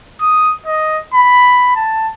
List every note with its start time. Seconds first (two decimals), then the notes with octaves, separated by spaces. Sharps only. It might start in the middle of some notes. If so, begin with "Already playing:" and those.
0.21 D#6
0.66 D#5
1.14 B5
1.76 A5